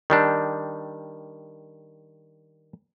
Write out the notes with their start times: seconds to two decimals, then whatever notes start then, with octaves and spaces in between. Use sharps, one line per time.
0.10 D#3 G3 D4